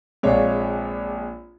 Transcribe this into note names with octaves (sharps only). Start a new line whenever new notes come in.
A#1 C3 G#3 C#5 D5 F5